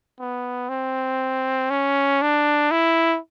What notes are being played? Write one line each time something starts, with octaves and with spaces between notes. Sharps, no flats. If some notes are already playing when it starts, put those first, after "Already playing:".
B3
C4
C#4
D4
E4